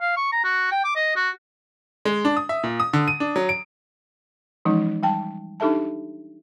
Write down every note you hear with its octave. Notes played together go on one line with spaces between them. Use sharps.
F5
C#6
A#5
F#4
G5
D6
D#5
F#4
G#3
D4
D#6
E5
A#2
D#6
D3
D#7
D4
F#3
D7
E3 F3 G#3 C#4 D#4
G3 G5 A5
D4 D#4 G4 A4 E5 A5